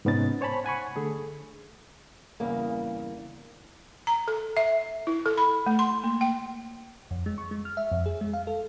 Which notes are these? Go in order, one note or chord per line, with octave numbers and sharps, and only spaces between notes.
G#2 C3 B3 C#4 D#4 A6
C5 C#5 G#5 A5 B5
F#5 G#5 B5 C#6
D3 A3 G#4 A4
E2 G2 C#3 A#3
A#5
A4
E5
E4
A4
B5
A3
C6
A#3
G5
F2
G#3
C#6
G#3
F6
E5
F2
G#4
G#3
F5
A4